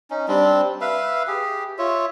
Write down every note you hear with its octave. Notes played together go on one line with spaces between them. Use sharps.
C#4 D#4
G3 C4 D4
B4 E5 F5
G4 G#4
F4 C#5 E5